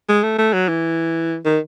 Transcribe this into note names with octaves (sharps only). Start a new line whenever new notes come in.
G#3
A3
A3
F#3
E3
D#3